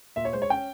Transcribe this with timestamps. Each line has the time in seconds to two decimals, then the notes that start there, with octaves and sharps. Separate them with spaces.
0.16 A#2 E5
0.25 C#5
0.33 G#3 C5
0.42 C#5
0.50 C#4 G5